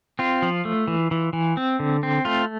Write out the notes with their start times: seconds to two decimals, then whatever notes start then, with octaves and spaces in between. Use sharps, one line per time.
0.19 C4 F4
0.42 F3
0.65 A3
0.88 E3
1.11 E3
1.33 E3
1.57 C4
1.80 D3
2.03 C4
2.25 A3 F4